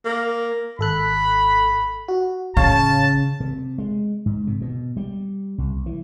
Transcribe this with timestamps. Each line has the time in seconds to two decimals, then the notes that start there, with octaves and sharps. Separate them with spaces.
0.05 A#3
0.79 G#1 A4 B5 F#6
2.08 F#4
2.57 A1 C#3 C#5 F5 A5
3.40 C3
3.78 G#3
4.26 G#2
4.47 C3
4.61 B2
4.97 G3
5.58 C2
5.86 E3